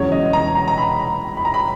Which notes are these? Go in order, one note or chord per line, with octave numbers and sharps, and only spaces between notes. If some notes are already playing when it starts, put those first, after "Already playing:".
Already playing: E1 E2 C#3 F#3 C#4 C#5
D#5
A#5
A#5
A#5
B5
B5
A#5
B5